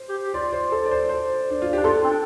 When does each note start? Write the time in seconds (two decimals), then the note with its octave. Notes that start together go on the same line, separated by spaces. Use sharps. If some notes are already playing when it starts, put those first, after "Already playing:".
Already playing: C5
0.09 G4
0.22 G4
0.34 F4 D5
0.53 C5
0.72 A4
0.86 D5
0.91 C5
1.09 C5
1.50 D4
1.62 F4
1.73 D4 G4
1.85 F4 A4
2.04 C4
2.10 D4